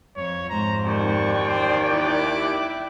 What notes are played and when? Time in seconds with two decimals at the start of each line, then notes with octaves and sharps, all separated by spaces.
0.16 F2 C#5
0.49 F2 G#2 C5 A#5
0.86 D#2 D5 G5 C#6
1.49 C5
1.89 E4 D6 F#6